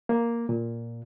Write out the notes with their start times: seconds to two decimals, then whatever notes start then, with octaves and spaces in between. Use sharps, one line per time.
0.09 A#3
0.49 A#2